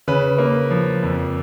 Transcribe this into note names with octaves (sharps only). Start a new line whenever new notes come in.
C#3 B4
A#3
F3
F2